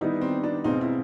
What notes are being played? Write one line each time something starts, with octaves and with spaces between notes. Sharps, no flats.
D#3 G3 B3 D#4 E4 G4
C4
D4
B2 G#3 C4 D#4 F4
E4